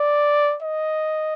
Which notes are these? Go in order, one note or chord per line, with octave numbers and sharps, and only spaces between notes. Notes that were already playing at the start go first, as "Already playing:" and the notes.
Already playing: D5
D#5